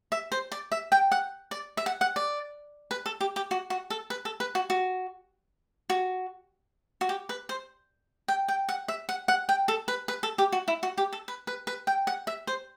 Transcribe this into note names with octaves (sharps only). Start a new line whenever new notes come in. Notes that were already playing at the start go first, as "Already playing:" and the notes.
E5
C5
D5
E5
G5
F#5
D5
E5
F#5
F#5
D5
B4
A4
G4
G4
F#4
F#4
A4
B4
A4
B4
F#4
F#4
F#4
F#4
G4
B4
C5
G5
G5
F#5
E5
F#5
F#5
G5
A4
B4
B4
A4
G4
F#4
E4
F#4
G4
A4
B4
B4
B4
G5
F#5
E5
C5